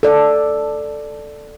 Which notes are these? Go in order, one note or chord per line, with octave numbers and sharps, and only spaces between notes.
A4 D5